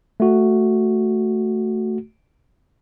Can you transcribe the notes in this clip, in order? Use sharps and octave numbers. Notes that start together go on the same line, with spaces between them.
A3 F#4